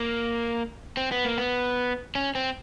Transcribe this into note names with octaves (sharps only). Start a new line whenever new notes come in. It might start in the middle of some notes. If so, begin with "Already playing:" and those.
Already playing: A#3
C4
B3
A#3
B3
C#4
C4